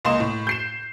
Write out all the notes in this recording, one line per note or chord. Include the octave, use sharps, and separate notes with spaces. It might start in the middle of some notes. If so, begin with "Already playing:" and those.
C#2 A#3 D#5 C6 E7
A2
G6 C7 E7